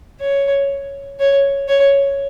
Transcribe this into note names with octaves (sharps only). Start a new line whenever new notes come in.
C#5
C#5
C#5